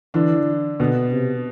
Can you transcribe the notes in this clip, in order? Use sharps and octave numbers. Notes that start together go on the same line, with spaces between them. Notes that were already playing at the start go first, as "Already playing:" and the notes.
D3 E3 D4
B2 D3 B3
C3